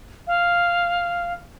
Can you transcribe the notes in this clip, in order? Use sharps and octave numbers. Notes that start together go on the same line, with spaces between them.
F5